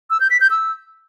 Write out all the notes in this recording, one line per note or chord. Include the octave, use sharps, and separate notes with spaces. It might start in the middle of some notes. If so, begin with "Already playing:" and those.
E6
G6
B6
G6
E6